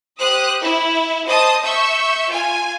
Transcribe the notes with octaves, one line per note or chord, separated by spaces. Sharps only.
G4 C5 D#6 F#6
E4
C5 D#5 A5 D#6
E5 C#6 E6 G6
F4 G#5